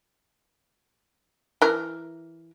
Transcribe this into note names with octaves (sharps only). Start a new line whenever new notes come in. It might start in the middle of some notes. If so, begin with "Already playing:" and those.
E3 A#4